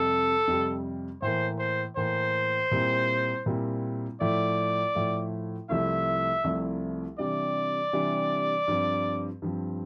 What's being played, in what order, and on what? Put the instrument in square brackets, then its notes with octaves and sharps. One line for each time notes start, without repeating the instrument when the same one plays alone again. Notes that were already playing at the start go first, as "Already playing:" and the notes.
Already playing: [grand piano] F2 C3 G3 [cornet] A4
[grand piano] F2 C3 G3
[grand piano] A2 E3 A#3 [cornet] C5
[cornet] C5
[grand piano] A2 E3 A#3 [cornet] C5
[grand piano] A#2 G3 C4 E4
A#2 G3 C4 E4
[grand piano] A2 F3 A3 E4 [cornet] D5
[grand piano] A2 F3 A3 E4
[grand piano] C2 C3 F3 A3 E4 [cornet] E5
[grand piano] C2 C3 F3 A3 E4
[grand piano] C3 E3 G3 D4 [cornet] D5
[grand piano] C3 E3 G3 D4
G2 F3 C4
G2 F3 C4